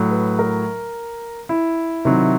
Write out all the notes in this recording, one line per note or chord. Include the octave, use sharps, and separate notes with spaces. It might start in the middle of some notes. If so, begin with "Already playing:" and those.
Already playing: A2 F#3
B4
A#4
E4
C3 D#3 F#3